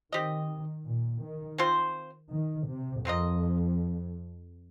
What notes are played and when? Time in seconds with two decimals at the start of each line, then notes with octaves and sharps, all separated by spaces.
0.12 D#3 C4 G4 D#5
0.86 A#2
1.23 D#3
1.58 C4 F4 C5
2.32 D#3
2.69 C3
3.05 F2 C4 F4 A#4 D#5